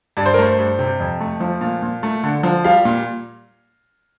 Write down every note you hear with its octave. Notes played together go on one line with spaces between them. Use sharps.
G2 D5
C5
A#4
A3 C5
G2
C3
F2
A3
F3
A#2
A#2
A3
D3
F3
G3 F5
A#2